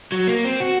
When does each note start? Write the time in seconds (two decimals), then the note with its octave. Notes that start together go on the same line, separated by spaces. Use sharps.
0.12 F#3
0.28 A#3
0.45 C4
0.60 F#4